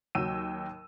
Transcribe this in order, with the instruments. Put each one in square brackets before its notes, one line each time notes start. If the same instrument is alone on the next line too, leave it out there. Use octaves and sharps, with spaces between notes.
[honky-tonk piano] D#2 F#3 G5 E6 D#7